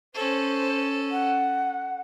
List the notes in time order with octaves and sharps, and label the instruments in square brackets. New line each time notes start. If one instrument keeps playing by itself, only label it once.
[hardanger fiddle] C#4 A4 [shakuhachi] C5
[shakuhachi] F#5